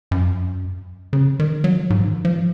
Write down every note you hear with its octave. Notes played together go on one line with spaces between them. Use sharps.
F#2
C#3
D#3
F#3
G#2
F3
D#3
F3